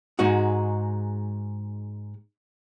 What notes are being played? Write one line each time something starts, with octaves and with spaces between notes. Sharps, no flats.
G#2 G#3 D#4 F#4